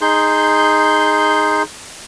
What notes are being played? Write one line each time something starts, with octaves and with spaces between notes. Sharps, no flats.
D#4 G#4 C6 G6